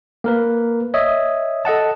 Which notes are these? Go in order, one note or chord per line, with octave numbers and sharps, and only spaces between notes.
A#3 A#4 B4
C#5 D#5 E5 D#6
A4 D#5 F#5 A5